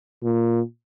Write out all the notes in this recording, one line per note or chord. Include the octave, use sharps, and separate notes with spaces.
A#2